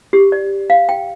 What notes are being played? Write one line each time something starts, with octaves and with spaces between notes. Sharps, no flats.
G4
D5
F5
G5